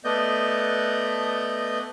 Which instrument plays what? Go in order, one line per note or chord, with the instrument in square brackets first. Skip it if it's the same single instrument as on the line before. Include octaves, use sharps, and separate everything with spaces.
[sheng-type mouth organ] A3 B3 D5 D#5 G6